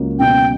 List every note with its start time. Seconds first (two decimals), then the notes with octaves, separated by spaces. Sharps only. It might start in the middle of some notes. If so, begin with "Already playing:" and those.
Already playing: C#2 F#3 A#3
0.19 B2 G5